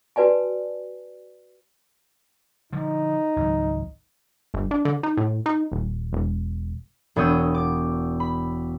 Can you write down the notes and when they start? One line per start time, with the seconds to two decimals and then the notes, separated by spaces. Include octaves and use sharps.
0.16 F#4 B4 D5 G#5 A5
2.72 D3 F3 D#4
3.36 G#1 C#2 F#3
4.54 G1
4.71 D4
4.85 D3
5.03 D#4
5.17 A2
5.46 D#4
5.72 D#1
6.13 E1
7.16 E1 B3 C#5 D#6 E6 G6
7.55 D6
8.20 B5